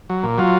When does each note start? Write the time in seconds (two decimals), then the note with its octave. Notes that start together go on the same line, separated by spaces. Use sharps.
0.10 F#3
0.23 A#2
0.38 F#3 F4